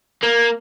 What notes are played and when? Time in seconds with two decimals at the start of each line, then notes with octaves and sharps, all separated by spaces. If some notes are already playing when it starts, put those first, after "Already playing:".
0.23 A#3